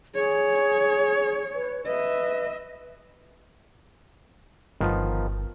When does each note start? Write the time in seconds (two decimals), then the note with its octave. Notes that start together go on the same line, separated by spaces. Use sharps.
0.15 G#4 C#5
1.55 B4
1.86 B4 D#5 E5
4.81 G1 D#3 F3 B3